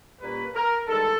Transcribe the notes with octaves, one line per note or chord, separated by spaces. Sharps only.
A#2 G3 A#3 C#4 B4
A#4
G2 D#3 G#3 A4